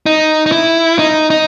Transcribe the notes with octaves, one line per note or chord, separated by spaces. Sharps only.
D#4
D#4
E4
D#4
D#4